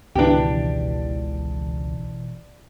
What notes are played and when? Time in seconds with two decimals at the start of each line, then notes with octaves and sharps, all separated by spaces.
0.15 G#1 C#2 B2 E3 D4 G4